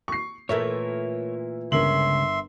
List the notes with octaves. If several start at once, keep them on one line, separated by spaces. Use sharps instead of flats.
C#6 C7
A#2 E3 A3 A#4 C#5 E5
G1 C#2 C#3 C#4 A#4 E5 C6 F#7